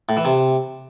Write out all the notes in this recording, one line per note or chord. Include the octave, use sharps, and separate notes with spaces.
A2
E3
C3